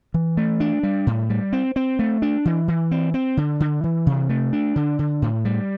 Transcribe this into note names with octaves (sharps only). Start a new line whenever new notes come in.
E3
A3
D4
G3
A2
G3
C4
C4
A3
D4
E3
E3
C4
C4
D3
D3
E3
C3
A3
D4
D3
D3
A2
G3